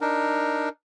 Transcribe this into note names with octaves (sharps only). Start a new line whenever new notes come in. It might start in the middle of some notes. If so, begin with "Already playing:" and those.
D4 D#4 A#4